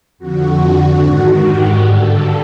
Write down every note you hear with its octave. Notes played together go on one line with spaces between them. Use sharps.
F2 D3 F#4
G#2 D#3
G4
G2 D3 A4